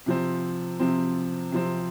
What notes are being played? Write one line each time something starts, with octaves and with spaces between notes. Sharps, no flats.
C3 F3 C4
C3 F3 C4
C3 F3 C4